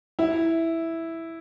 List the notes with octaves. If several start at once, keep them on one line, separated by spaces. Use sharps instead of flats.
E4